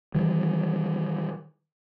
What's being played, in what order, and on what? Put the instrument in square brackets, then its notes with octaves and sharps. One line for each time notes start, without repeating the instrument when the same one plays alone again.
[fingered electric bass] D#3 E3 G3